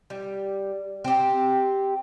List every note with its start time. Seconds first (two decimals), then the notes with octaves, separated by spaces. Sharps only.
0.10 G3
1.04 C4 G4